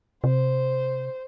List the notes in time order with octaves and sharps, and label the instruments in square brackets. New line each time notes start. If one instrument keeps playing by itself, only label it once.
[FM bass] C3 [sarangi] C5